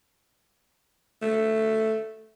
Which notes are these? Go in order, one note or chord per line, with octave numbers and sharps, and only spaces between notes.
A3